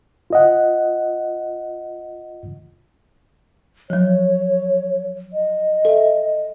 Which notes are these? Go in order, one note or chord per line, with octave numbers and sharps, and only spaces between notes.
F4 D#5 F#5
F3 F#3 C#5
D#5
A4 E5